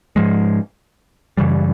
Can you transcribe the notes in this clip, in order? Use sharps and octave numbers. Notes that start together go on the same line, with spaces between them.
G#2 F3 G#3
F#2 C#3 E3 G3